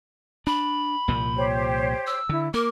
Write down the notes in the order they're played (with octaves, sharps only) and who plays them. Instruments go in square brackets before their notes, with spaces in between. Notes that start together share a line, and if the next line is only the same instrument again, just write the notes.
[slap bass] D4 [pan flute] B5
[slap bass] C2 A#2 F3
[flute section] G4 C5 C#5
[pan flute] E6
[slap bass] D3 [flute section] E4
[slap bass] A#3 [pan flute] A#4 [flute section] D6